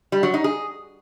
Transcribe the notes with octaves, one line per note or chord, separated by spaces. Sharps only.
G3
F#3
D#4
G#4